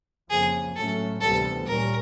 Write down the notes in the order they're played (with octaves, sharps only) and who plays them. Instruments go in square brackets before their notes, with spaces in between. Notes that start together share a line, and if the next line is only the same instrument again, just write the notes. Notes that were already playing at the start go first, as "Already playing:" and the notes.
[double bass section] F2 C#3 F3 A#3 [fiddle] G#4
[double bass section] A2 F#3 A3 C#4 [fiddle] A4
[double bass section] D2 C3 E3 G3 B3 [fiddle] A4
[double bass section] A#2 G3 A#3 C#4 [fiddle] A#4